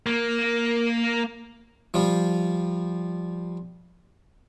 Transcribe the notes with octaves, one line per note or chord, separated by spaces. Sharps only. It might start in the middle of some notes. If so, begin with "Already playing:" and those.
A#3
F3 G3 F4